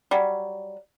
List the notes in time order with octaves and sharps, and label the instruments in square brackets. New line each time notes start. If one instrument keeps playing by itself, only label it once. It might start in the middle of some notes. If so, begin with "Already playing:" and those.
[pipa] F#3 G3